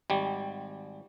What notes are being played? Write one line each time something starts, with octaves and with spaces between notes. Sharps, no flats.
G#1 G3